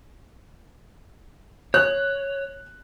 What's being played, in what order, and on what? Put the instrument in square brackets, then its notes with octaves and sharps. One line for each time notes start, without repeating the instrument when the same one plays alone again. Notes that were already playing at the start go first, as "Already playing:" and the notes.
[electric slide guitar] C#5 [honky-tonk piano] F#6